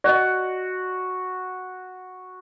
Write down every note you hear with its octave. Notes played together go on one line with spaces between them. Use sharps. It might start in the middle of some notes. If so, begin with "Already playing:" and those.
F#4 D5 D#5